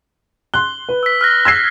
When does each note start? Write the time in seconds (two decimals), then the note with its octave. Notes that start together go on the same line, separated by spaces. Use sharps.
0.54 C6 F#6 G7
0.89 B4
1.03 E6 B6
1.21 F6 F#6 A#6
1.45 E6 G#6 C7